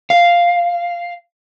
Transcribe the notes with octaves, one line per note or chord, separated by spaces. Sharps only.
F5